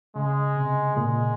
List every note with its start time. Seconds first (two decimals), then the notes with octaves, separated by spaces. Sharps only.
0.16 C#3 G#3
0.56 C3
0.96 A#2 G#3